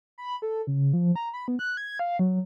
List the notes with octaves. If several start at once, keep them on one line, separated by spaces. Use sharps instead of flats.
B5
A4
C#3
F3
A#5
B5
B3
F#6
G#6
F5
F#3